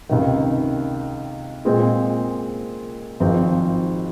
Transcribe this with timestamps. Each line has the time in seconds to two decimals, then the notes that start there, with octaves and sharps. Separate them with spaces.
0.09 C#2 C3 D#3
1.65 A#2 G#3 C4 F4 G#4
3.20 G#1 G#2 F3 C4